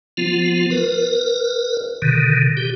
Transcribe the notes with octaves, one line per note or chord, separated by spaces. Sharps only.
F3 B3 F4
A#4 B4
B2 D3 D#3
G4